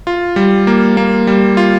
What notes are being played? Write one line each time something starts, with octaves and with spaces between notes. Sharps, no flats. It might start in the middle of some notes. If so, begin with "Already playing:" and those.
F4
G3
A#3
A#3
G3
F4